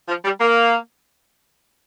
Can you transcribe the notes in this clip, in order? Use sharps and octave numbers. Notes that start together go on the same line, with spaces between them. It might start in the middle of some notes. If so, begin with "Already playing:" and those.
F3
G3
A#3